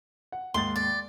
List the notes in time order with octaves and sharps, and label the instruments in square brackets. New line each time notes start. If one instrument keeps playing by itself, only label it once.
[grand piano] F#5
[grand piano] D#2 G#2 A6 [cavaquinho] C6
[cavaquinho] D5